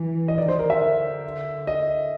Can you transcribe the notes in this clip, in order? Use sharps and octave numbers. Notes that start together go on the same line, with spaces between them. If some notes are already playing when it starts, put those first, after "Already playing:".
Already playing: E3
D#5
D#3 D5
C5
A#4
E5
D3
D#5